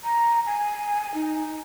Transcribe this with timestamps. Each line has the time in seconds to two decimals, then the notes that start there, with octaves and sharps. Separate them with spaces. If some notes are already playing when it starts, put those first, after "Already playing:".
0.04 A#5
0.46 G#5
1.14 D#4